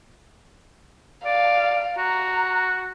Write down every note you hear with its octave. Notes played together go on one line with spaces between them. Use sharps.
D5 F5
F#4 A#5